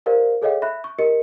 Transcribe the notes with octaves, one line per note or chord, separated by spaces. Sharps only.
G4 A#4 C5 D5 F5
G#4 A4 C#5 D#5 F5 G5
E5 B5 F#6
C#6
G4 A#4 D#5 C#7